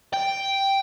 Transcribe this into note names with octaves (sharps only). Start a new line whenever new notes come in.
G5